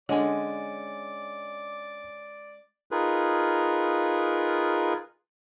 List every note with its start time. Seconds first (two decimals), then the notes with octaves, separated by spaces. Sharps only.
0.09 D3 G#3 C#4 C#5 D5 G#5
2.91 D#4 F4 G#4 A#4 B4